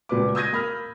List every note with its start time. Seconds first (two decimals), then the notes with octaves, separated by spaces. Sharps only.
0.09 C#2 A#2 B4 D6
0.35 D#6 E6 G6 G#6 A#6 D#7
0.53 A#3 B5 F6